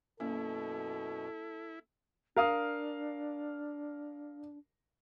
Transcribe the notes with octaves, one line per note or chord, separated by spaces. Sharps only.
F#2 B2 A#3 C#4 E4 A4
D4 A#4 F5 D#6